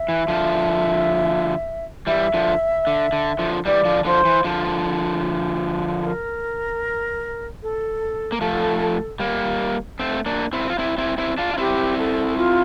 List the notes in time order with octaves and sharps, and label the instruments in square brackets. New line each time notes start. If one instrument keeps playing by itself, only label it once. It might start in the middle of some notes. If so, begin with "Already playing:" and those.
Already playing: [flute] E5
[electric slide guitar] E3
D3 F3
[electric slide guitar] E3 G3 [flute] E5
[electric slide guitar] D3 F3
D3
D3
D3 F3
[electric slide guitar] E3 G3 [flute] D5
[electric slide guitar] D3 F3
[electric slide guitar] D3 F3 [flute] C5
[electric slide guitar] E3
D3 F3
[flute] A#4
A4
[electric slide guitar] A#3
[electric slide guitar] F3 A3 [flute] A4
[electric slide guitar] G3 A#3
A3 C4
A#3 D4
C4 E4
F4
C4 E4
C4 E4
C4 E4
D4 F4
F4
[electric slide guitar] C4 E4 [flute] G4
[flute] A4
F4